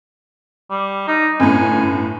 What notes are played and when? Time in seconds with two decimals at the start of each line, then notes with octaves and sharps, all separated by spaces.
0.70 G3
1.08 D#4
1.40 G1 F#2 A2 G#5